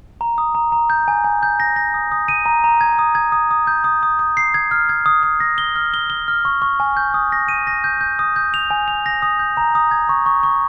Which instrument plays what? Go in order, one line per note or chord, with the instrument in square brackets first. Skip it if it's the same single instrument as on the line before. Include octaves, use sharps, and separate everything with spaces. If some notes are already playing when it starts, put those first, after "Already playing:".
[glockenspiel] A#5
D#6
A#5
A#5
G6
G#5
G#5
G6
A#6
A#6
D#6
D#6
D#7
A#5
A#5
G#6
D#6
G#6
D#6
D#6
G6
D#6
D#6
D#6
C7
G#6
F6
G#6
D#6
D#6
A#6
G7
F6
G7
G7
F6
C#6
C#6
G#5
G6
D#6
A#6
D#7
A#6
G6
G6
D#6
G6
F7
G#5
F7
A#6
D#6
G6
A#5
D#6
G#6
C#6
C#6
C#6